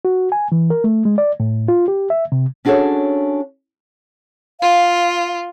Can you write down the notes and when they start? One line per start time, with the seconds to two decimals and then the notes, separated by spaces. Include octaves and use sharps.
0.05 F#4
0.32 G#5
0.52 E3
0.70 A#4
0.84 A3
1.05 G#3
1.18 D5
1.40 A2
1.68 F4
1.88 G4
2.10 E5
2.32 C3
2.65 C#4 D4 F#4 G#4 A4 C#5
4.60 F4 F5